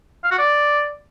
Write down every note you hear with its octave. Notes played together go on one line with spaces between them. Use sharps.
F5
F#4
D5